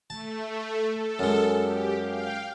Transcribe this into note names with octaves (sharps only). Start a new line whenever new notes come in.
A3 A5
A4
F#2 G#3
G4
F5 G5